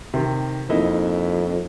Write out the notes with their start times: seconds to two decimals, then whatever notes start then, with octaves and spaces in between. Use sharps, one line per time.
0.14 C3 D#3
0.70 F2 A#3 D#4 E4